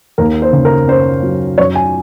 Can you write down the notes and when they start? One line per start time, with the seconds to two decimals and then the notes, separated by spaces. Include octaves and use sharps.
0.18 D#2 A#4
0.42 C5
0.53 C#3
0.65 A#4
0.88 C#4 C5
1.23 F#3
1.58 F#2 C#5
1.75 G#5